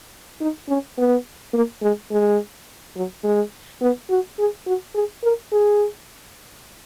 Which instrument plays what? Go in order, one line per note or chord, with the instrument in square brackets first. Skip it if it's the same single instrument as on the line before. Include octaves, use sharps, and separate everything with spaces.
[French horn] D#4
C#4
B3
A#3
G#3
G#3
F#3
G#3
B3
F#4
G#4
F#4
G#4
A#4
G#4